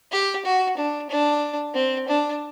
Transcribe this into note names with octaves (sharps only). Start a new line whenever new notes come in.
G4
F#4
D4
D4
C4
D4